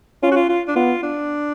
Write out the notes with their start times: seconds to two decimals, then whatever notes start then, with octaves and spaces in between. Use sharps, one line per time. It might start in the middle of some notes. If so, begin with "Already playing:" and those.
0.23 C#4 F4
0.32 F#4
0.36 F4
0.49 F4
0.68 D4
0.76 B3 F4
1.03 D4